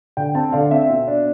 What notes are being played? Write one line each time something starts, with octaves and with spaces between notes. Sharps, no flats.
D3 G5
C4 A5
D3 F5
C4 E5
B2
D4